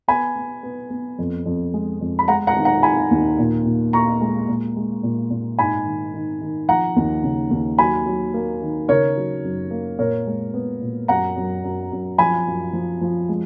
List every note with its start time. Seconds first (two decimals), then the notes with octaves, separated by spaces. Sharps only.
0.08 B3 G#5 B5
0.35 B3
0.63 B3
0.90 B3
1.19 F2
1.46 F2
1.74 G#3
2.01 F2
2.19 B5
2.28 G#3 F#5 A#5
2.47 F#5 A#5
2.56 D#3
2.65 F#5 A#5
2.83 D#3 G#5 B5
3.11 D#2
3.39 A#2
3.65 A#2
3.93 A#2 A#5 C#6
4.21 G#3
4.48 A#2
4.76 G#3
5.03 A#2
5.30 A#2
5.59 G#2 G#5 B5
5.86 D#3
6.14 D#3
6.41 D#3
6.68 F3 F#5 A#5
6.96 D#2
7.23 C#3
7.51 D#2
7.78 F#3 G#5 B5
8.06 F#3
8.34 A#3
8.62 D#3
8.88 C#3 A#4 C#5
9.17 F#3
9.44 F#2
9.71 A#3
9.99 A#2 A#4 C#5
10.27 G#3
10.54 B3
10.81 A#2
11.08 F#2 F#5 A#5
11.36 F#2
11.64 F#2
11.92 F#2
12.18 F3 G#5 B5
12.47 F#2
12.73 F3
13.01 F3
13.29 G#3